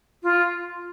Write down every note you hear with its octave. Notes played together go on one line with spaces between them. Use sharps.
F4